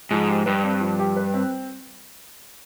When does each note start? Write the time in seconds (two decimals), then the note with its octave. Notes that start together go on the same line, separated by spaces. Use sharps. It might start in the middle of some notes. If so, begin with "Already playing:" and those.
0.11 G#2 F3
0.28 G4
0.46 G2 B4
0.64 C4
0.81 F3
0.99 G4
1.16 B4
1.34 C4